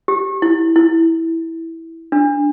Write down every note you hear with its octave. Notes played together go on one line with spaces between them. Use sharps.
G4
E4
E4
D4